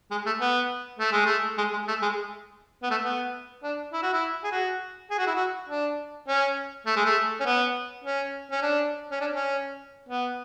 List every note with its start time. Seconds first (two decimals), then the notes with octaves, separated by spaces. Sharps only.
0.11 G#3
0.26 A3
0.41 B3
0.99 A3
1.12 G#3
1.26 A3
1.58 G#3
1.73 G#3
1.88 A3
2.02 G#3
2.83 B3
2.91 A3
3.05 B3
3.63 D4
3.93 E4
4.03 F#4
4.13 E4
4.44 G#4
4.52 F#4
5.11 G#4
5.18 F#4
5.27 E4
5.35 F#4
5.69 D4
6.28 C#4
6.86 A3
6.97 G#3
7.05 A3
7.40 C#4
7.46 B3
8.04 C#4
8.51 C#4
8.62 D4
9.11 C#4
9.21 D4
9.35 C#4
10.09 B3